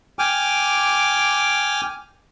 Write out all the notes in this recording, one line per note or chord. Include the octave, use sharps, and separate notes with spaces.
G5 G#5 D6 F6